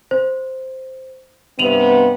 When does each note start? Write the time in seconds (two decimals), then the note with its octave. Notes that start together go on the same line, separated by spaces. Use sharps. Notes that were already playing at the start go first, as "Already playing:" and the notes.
0.11 C5
1.59 G2 C3 B3 D#7 F7 F#7